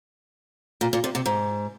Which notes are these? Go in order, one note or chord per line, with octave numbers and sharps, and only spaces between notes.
A#2
A#2
C3
C3
G#2